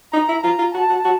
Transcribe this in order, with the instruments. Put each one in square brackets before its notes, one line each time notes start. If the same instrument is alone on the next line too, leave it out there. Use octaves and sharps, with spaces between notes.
[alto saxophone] D#4 [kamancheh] A#5
[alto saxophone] E4
[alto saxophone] F4 [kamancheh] A#5
[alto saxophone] F4
[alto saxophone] F#4 [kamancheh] A5
[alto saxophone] F#4
F#4